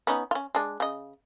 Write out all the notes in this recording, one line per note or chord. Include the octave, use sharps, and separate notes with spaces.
B3 C#4 D#4
C#4 F4
G#3 D4
C#3 D#5